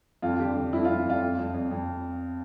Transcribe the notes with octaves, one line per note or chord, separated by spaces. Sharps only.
F2 F4
D3 G4
D3
F2 E4
F4
F2
F2 F4
F2
F2
F2
F2